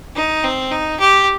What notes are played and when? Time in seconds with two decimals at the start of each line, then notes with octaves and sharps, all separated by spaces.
0.16 D#4
0.44 C4
0.71 D#4
1.00 G4